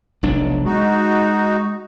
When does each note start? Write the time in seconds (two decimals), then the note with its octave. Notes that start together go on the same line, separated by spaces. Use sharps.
0.23 F1 B1 D4
0.66 G#3 D#4 F#4